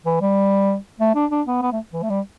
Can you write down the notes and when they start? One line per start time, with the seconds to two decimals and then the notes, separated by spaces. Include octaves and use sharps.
0.05 E3
0.21 G3
1.00 A3
1.15 D4
1.31 D4
1.47 B3
1.62 B3
1.72 A3
1.93 E3
2.03 A3
2.10 G3